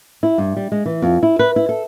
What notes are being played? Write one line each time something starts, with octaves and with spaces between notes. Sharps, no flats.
E4
G2
G3
G#3
E3
F2
E4
B4
E4
A4